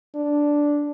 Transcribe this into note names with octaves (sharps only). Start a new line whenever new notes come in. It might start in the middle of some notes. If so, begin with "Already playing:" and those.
D4